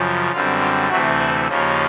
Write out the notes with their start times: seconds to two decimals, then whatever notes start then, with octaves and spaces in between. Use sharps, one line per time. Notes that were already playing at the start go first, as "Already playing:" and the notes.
Already playing: F#2 C#3 F3
0.32 F#2 D3 G3 C4 F4
0.60 F4
0.89 D2 C3 E3 F#3 A3 C4 F#4
1.18 E4
1.47 D#2 C#3 F3 A#3 C#4